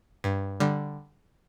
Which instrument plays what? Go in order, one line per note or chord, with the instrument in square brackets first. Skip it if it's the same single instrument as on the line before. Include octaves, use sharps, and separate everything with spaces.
[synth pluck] G2
D3 G3